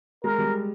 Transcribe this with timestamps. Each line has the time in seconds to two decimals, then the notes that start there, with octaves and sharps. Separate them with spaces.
0.24 G#3 A#4
0.38 G3